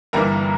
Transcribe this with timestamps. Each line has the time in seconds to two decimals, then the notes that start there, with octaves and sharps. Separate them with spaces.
0.13 G1 G2 E3 G3 A#3 A#4 A#5